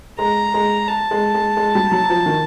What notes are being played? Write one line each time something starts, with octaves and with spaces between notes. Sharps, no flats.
G#3 A#5
G#3
A5
G#3
G#3
G#3
G3
F#3
F3
D#3